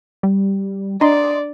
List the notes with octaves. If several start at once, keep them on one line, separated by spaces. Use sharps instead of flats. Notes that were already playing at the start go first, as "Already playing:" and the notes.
G3
D4 D5 D#5 C6